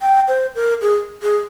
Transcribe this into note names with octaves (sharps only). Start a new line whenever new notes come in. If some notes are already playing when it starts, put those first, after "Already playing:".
G5
C5
A#4
G#4
G#4